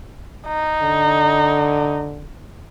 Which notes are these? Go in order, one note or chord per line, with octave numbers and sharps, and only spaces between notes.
D#4
D3